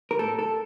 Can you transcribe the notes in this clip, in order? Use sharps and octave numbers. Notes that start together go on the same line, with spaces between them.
A#4
A2 A4
A4